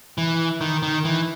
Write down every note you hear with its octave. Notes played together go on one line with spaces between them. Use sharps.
E3
D#3
D#3
E3